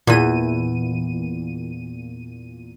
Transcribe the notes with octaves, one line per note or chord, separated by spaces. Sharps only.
E2 A#2 E3 D#7